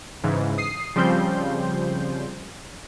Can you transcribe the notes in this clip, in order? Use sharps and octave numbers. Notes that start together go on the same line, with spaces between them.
G#2 C#3 E3
D#6 C7
C#3 F3 G3 C4 C6 G6